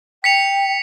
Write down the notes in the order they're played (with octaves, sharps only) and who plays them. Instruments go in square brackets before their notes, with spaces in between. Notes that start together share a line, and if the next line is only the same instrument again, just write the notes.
[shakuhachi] G5 [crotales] B6 C#7 F7